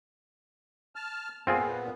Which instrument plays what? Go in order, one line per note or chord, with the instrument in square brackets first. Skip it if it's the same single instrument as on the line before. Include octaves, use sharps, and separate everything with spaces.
[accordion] A5 F6
[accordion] A#2 B3 [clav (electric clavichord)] C4 F4 G#4